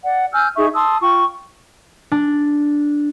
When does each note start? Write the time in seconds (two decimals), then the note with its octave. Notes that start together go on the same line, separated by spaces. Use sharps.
0.04 D5 F#5
0.33 G#5 E6 F6 G6
0.56 D#4 G#4 E5 C#6
0.74 A5 C6 D#6 E6
1.01 F4 G5 C#6
2.12 D4